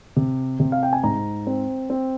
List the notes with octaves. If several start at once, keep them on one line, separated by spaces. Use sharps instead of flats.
C3
C3
F5
G5
G#5
G#2 A#5
C4
C4